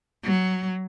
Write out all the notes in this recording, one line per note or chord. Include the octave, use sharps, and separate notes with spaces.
F#3